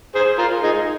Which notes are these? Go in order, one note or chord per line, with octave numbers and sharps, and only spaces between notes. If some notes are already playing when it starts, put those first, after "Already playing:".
G#4 C5
F4 A#4
D#4 G#4